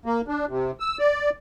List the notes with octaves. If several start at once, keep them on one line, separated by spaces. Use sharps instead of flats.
A#3
D4
C3
E6
D5